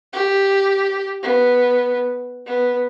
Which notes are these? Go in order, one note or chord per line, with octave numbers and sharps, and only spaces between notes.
G4
B3
B3